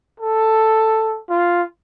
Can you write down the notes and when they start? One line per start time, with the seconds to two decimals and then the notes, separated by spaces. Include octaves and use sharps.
0.20 A4
1.29 F4